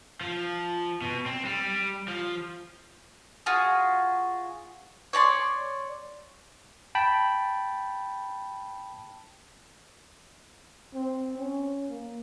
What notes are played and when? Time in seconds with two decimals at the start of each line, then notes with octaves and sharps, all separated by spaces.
0.21 F3
1.02 B2
1.26 C4
1.45 G3
2.08 F3
3.46 F4 F#4 G#4
5.13 C#5 D5 A#5 C6
6.95 G5 A5 B5
10.95 C4
11.39 C#4
11.89 A#3